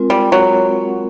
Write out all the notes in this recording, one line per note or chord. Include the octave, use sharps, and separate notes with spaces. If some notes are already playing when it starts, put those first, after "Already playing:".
Already playing: G#3 C4 F4 A#4
G3
F#3